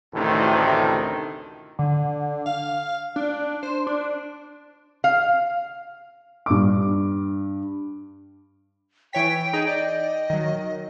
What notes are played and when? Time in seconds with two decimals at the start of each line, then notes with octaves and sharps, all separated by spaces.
0.14 A1 D2 A2 C3 D#3
1.79 D3
2.46 F5
3.16 D4
3.63 C5
3.87 D4
5.04 F5
6.46 G2 D6
9.13 E3 C#5 G5 B6
9.53 D#4 G#4
9.67 D5 D#5 G5
10.30 D#3 F#3